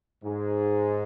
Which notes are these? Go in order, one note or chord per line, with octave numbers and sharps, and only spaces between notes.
G#2